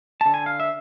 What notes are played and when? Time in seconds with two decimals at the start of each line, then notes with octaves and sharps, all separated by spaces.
0.21 D3 A5
0.34 G#5
0.46 F5
0.60 E5